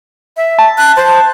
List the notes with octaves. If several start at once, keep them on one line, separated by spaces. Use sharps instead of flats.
E5
A5
F#6
C5 A5